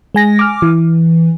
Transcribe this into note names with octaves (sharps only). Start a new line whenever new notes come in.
G#3 G#5 A#6
D6 F6
E3